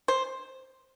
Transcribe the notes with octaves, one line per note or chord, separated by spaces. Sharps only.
C5